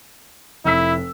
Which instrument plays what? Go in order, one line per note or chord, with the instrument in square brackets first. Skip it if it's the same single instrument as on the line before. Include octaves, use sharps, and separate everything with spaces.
[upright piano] F1 E6 B6 [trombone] E4